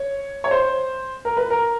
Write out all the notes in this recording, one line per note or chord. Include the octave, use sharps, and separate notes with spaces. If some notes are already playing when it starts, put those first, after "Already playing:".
Already playing: C#5
C#5
C5
A#4
B4
A#4